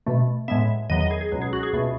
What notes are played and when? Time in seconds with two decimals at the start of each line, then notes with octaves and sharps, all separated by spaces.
0.07 B2 A3
0.48 A2 G#3 B3 E5
0.90 E2 D#3 F#3 B3 D#5
1.01 D#5
1.11 G#4
1.21 G#4
1.32 C#2 B2 F#3
1.42 G#4
1.53 F#4
1.63 G#4
1.73 C#2 B2 A3